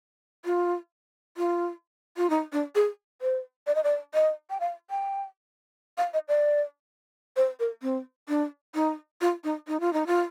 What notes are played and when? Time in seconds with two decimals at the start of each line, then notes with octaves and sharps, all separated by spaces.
0.45 F4
1.37 F4
2.17 F4
2.30 D#4
2.52 D4
2.75 G#4
3.22 C5
3.67 D5
3.75 D#5
3.84 D5
4.14 D#5
4.50 G5
4.60 F5
4.90 G5
5.98 F5
6.14 D#5
6.28 D5
7.36 C5
7.60 A#4
7.82 C4
8.29 D4
8.75 D#4
9.21 F4
9.44 D#4
9.68 D#4
9.80 F4
9.93 D#4
10.07 F4